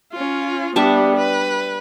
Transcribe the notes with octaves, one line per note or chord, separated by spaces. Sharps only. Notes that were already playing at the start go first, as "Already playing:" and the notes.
C#4 F4
G3 B3 D4 G4 E5
B4